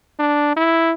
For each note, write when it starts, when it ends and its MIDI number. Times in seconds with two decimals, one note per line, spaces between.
0.19 0.54 62
0.56 0.93 64